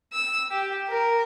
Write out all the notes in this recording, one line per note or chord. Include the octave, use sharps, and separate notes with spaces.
E6
G4
A#4